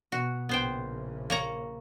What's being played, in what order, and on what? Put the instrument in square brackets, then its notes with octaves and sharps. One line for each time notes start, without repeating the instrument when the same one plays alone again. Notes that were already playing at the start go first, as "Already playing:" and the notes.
[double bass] B2 [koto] F#4
[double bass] A#1 C#3 [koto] B3 C5 G5
[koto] A#3 C#5 A#5